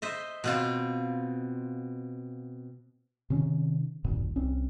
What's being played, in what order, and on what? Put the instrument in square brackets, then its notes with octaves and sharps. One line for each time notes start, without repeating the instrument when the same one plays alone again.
[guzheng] C5 D#5 E5
B2 C4 F4
[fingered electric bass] C3 D#3 C#4
D#1 G#1 F#2 A#2
C2 C4 C#4